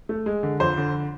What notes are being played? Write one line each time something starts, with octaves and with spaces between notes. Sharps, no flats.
A3
G#3
D3
F2 C5
D3